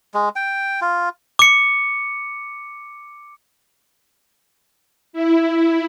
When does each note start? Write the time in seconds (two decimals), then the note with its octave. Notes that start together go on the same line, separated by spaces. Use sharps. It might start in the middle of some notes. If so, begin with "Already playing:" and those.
0.14 G#3
0.36 G5
0.81 F4
1.39 D6 C#7
5.13 E4